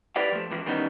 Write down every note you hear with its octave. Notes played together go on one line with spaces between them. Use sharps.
E4 G4 B4 D5 F5
F3 A3
C#2 E3 F3
D#3 E3 G3 B3 C#4 D#4